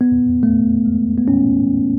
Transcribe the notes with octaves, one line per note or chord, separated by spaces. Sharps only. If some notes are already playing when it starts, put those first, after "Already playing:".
B3
A3
G#3
B3
C#4